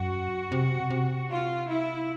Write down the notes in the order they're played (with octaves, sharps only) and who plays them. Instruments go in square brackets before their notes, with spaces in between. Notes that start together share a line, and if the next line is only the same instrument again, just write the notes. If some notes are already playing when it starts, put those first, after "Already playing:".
Already playing: [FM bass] F#2 [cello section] F#4
[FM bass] C3
C3
[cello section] F4
E4